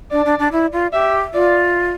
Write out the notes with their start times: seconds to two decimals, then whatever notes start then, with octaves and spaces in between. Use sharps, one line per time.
0.11 D4 D5
0.25 D4
0.39 D4
0.52 E4
0.73 F4
0.93 G4 E5
1.33 F4 D5